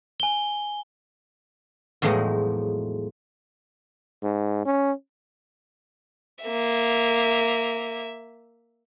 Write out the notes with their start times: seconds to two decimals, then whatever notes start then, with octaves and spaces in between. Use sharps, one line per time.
0.20 G#5 G7
2.02 E2 A2 F3 F#3 G#3 D#4
4.23 G#2
4.65 C#4
6.45 A#3 E5